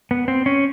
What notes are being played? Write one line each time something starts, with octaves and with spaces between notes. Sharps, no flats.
B3
C4
C#4